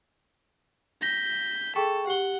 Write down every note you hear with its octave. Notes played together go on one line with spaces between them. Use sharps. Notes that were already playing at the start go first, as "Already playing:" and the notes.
G6 A#6 B6
G#4 A4 G5 C#6
G4 F#5 G7